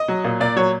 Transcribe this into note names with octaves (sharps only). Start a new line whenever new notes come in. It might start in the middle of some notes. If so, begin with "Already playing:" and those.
Already playing: D#5
F#3
A#2
A#2 D5
F#3 C#5